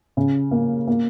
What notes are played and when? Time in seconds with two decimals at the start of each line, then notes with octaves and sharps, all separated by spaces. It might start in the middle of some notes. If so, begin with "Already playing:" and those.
0.17 C#3
0.51 A#3
0.87 A#3